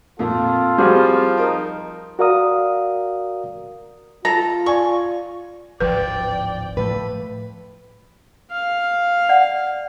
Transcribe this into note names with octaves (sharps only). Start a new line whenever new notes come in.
F2 A#2 F4 A4
F3 G3 C4 F#4 G#4
D#4 A#4
F#4 A#4 D5 F5 A#5 D#6
F4 A4 A#5
D5 G#5 C#6
D1 G#1 F3 B4 D5 G5
A2 F3 A3 B4
F5
D5 F#5